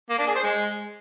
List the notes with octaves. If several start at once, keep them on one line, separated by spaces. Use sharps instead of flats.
A#3
D4
G#4
C5
G#3